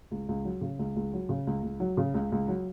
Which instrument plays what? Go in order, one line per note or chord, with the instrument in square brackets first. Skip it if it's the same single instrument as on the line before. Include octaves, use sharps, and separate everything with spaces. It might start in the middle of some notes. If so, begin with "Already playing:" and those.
[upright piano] C#2
C#2
F#3
C#3
C#2
C#2
F#3
C#3
C#2
C#2
F#3
C#3
C#2
C#2
F#3